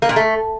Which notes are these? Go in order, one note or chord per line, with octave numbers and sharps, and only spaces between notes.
A#3
A#2
A3